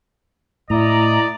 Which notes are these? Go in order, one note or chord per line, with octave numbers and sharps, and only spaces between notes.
A2 E4 D5 D#5 A#5